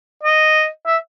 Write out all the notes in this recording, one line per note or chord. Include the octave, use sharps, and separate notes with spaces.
D#5
E5